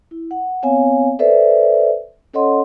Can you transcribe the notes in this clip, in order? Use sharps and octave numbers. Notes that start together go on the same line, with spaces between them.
E4
F#5
B3 C4 C#5 F5 G#5
A4 B4 C5 D5 E5
C#4 A4 C#5 D#5 F#5 C6